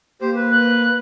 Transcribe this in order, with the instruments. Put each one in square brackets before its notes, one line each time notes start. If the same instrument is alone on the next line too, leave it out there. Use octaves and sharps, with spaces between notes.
[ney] A#3 [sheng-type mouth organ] G4 C5
[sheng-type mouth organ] B4
[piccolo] F#6